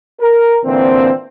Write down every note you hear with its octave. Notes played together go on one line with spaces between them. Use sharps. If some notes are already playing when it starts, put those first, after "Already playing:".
A#4
A#2 D3 E3 A#3 C4